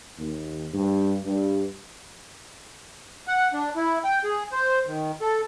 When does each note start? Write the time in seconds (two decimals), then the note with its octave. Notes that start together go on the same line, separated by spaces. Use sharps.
0.18 D#2
0.73 G2
1.24 G2
3.28 F#5
3.53 D4
3.76 E4
4.04 G5
4.24 G#4
4.52 C5
4.87 D#3
5.21 A4